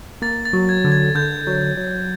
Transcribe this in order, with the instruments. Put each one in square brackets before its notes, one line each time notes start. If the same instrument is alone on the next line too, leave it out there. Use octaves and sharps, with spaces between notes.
[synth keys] A#3 [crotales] A6
[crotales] A6
[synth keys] F#3
[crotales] G#6
[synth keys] D3
[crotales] G#6
[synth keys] D3 [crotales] G6
[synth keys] F#3
F#3